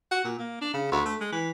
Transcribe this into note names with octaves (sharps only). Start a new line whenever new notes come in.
F#4
A#2
A#3
D4
C#3
D2
A3
G#3
E3